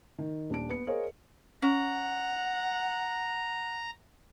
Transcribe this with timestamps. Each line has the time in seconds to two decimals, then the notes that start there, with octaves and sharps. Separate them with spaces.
0.18 D#3
0.50 D#1 D4 D7
0.69 B3 C#7
0.87 G#4 A#4 C5 C#5 D#5 F5
1.62 C#4 F#5 A#5